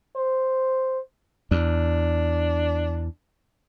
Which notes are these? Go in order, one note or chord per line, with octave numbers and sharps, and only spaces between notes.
C5
E2 D4